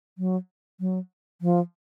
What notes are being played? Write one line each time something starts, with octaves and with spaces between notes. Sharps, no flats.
F#3
F#3
F3